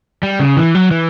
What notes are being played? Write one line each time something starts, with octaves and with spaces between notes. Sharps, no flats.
G3
C#3
E3
F#3
E3